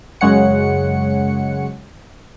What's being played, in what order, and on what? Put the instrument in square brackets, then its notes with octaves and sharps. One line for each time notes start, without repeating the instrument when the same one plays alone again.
[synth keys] F#2 C#3 G#3 C#5 F#5 C#7